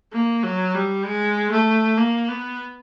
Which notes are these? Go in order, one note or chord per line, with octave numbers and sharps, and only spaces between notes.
A#3
F#3
G3
G#3
A3
A#3
B3